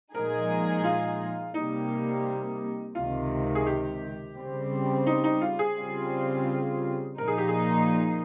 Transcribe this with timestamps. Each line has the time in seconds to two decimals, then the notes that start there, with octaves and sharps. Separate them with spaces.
0.14 A#2 F3 G#3 D#4 G#4 A#4
0.84 F4
1.54 C3 G3 A#3 D#4
2.95 C#2 C3 D#3 F4
3.55 G#4
3.66 G4
4.36 C#3 G3 C4
5.06 D#4
5.24 D#4
5.41 F4
5.59 G#4
5.77 C#3 G3 C4 F4
7.18 A#2 F3 A#3 D#4 A#4
7.28 G#4
7.38 G4
7.48 G#4